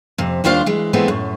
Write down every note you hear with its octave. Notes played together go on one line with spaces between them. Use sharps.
F2 C3
D#2 G3 D4 F4 C5 F5
E3 G#3
E3 G#3 A3 B3 C4 F4
F#2 A2